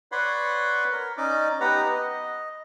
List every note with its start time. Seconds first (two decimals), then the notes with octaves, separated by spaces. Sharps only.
0.12 B4 C#5 D5 F#5 B5 C6
0.92 A#4
1.18 C#4 D#4 D5 D#5 D6
1.61 B3 D#4 G4 B4 F#5 A#5
1.89 D#5